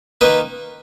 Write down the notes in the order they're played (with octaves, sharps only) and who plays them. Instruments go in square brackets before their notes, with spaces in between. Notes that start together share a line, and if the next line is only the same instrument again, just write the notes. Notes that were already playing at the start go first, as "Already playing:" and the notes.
[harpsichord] D#3 A#3 B4 D#5